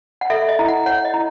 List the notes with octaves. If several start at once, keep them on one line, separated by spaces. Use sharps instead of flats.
F#5
A4 E5
D#5
E4
F#5
C#5 F#5
D#5
E4